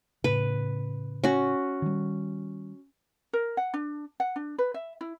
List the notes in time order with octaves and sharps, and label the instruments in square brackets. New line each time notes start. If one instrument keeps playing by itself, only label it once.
[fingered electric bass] A2 C#3 [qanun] B4
[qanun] C#4 F#4
[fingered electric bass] D#3 G3
[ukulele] A#4
F#5
D4
F#5
D4
B4
E5
E4